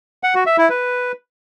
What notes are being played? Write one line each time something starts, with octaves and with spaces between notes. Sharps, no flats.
F#5
F#4
E5
E4
B4